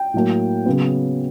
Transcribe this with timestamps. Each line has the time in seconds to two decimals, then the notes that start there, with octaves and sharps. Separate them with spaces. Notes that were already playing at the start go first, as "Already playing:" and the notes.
Already playing: G5
0.14 A2 F#3 A#3
0.66 C#3 F#3 B3